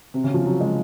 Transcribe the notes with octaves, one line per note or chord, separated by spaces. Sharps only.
C3
C#3
F3
F#3
G#3